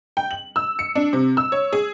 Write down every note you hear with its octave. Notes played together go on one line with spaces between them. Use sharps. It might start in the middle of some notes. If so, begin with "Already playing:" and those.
G5
F#7
E6
C#7
D4
C3
E6
C#5
G#4